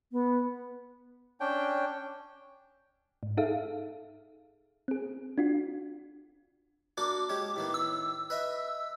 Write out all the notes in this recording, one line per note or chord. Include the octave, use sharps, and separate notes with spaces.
B3
C#4 D4 G5
G#2
D#4 G#4 A4 E5 F5
C4 G#4
D4 F4 F#4
A#3 D4 F#4 D6
G#3 C#4 G4
A2 D#3 B3
E6
B4 D#5 E5